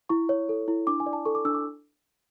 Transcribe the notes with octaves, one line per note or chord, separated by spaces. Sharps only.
E4 C#6
C#5
A4
E4
D4 D6
G#5
D5
A5
A4 C#6
D6
D4 E6
D6